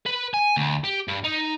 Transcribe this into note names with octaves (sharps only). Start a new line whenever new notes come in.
B4
G#5
D2
G4
G2
D#4